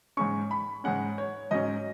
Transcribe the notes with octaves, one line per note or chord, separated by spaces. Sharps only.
G#2 G#3 C#4 C#6
B5
G#2 G#3 C#4 F#5
C#5
G#2 F#3 C#4 D#5